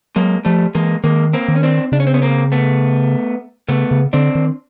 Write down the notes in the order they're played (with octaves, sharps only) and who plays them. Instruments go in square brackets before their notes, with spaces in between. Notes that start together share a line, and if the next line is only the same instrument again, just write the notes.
[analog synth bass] F#3 [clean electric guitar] G#3 A#3
[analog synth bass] F3 [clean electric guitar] G3 A3
[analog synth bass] E3 [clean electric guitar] G#3 A#3
[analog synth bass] D#3 [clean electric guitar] G#3 A#3
[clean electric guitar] A#3 C4
[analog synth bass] D#3
[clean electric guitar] C#4
C4 D4
[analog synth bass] C#3 [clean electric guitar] D4
[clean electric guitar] C#4
C4
B3 C#4
A#3 C4
A3 B3
[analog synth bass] C#3 [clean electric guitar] A3 B3
[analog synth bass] C#3
[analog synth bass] D3 [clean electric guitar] C4 D4
[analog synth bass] D#3